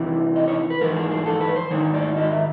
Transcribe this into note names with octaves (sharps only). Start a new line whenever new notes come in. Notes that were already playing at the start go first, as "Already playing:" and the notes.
Already playing: E2 C3 E3
D#5
C#5
B4
G#2 E3 A#4
G#4
G#4
A4
B4
C5
G#2 D#3 C#5
D5
D#5
E5